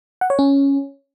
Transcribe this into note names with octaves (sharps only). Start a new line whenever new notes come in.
F#5
C#5
C#4